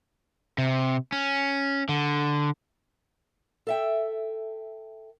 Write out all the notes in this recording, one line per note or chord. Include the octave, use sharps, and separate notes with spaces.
C3
C#4
D3
A4 E5 G5